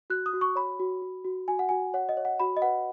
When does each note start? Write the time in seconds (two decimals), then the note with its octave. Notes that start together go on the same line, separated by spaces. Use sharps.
0.10 F#4 F#6
0.26 D#6
0.33 F#4
0.41 C#6
0.55 C#5 B5
0.80 F#4
1.02 F#4
1.25 F#4
1.48 F#4 G#5
1.59 F#5
1.69 F#4 G#5
1.94 C#5 F#5
2.09 D#5
2.17 C#5
2.25 F#5
2.40 F#4 B5
2.57 D#5
2.62 B4 F#5